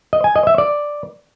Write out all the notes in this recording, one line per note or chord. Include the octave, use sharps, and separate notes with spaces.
D#5
G#5
D#5
E5
D5